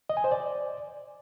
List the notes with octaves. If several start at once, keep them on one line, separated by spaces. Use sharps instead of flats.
D#5
G#5
C5
D5